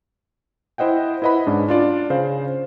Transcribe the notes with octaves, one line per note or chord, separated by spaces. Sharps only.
E4 C5 D#5 F#5 G5
E4 B4 D#5 F#5 B5
G#2 C#4 D4
D4 F4 D5
C#3 C5 F5